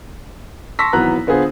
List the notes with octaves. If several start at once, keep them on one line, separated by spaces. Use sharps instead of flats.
A5 C6 C#6 E6 A#6 B6
G#1 E3 F#3 B3 A#5 F#6
D3 B3 F4 G#4 C5